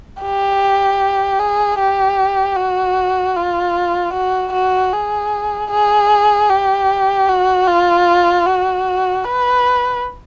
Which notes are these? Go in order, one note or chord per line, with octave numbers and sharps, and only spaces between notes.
G4
G#4
G4
F#4
F4
F#4
F#4
G#4
G#4
G4
F#4
F4
F#4
B4